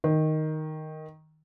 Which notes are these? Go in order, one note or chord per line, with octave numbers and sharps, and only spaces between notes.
D#3